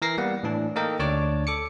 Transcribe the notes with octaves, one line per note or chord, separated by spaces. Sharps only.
E3 A#4 A#6 C7
G3 A#3 B3 F#5
A2 E3 D4
A#3 D#4 A4 A#4 D#5 G5
D2 D4 C#5 A5 D6
A4 D6 C#7